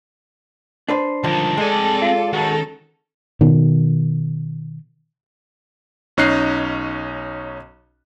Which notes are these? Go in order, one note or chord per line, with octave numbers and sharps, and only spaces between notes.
D4 B4 C5
C#2 G2 D3 D#3 F3 A5
G#3 C4 A4 D5 G#5
F4
D#3 C#4 F#4 A4
B2 D#3
B1 C#4 D#4 F#6 C7